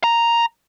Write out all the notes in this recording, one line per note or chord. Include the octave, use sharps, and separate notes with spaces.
A#5